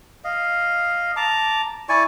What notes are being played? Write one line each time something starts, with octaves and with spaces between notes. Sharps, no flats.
D#5 F5
A5 A#5 D6
E4 D5 G#5 C#6